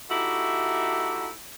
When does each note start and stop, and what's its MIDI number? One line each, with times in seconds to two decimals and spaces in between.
0.10 1.30 57
0.10 1.30 63
0.10 1.30 64
0.10 1.30 66
0.10 1.30 67